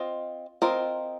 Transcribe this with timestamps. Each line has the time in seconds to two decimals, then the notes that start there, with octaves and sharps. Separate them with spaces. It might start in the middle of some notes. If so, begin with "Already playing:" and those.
Already playing: C4 F4 D#5
0.62 C4 F4 A#4 D#5